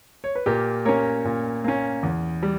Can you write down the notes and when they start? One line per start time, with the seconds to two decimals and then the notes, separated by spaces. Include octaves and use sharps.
0.24 C#5
0.35 B4
0.46 A#2 G4 A#4
0.85 A#3 C#4 A#4 C#5
1.25 A#2
1.64 A#3 C#4
2.03 E2
2.43 G3